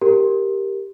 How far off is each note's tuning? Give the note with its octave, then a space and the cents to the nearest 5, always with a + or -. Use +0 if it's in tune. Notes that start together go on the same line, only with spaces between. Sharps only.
G4 +0 A#4 +0